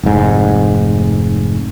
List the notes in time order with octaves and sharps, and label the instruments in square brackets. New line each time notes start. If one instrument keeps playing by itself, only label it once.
[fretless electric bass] F1 G#2